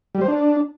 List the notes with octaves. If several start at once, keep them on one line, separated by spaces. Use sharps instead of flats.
G3
C5
D4